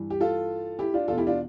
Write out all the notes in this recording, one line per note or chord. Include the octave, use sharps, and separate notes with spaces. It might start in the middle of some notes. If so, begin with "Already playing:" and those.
Already playing: G2 E3
G4
F4 A4
E4 G4
D4 F4
E2 B2 F4 A4
E4 G4
D4 F4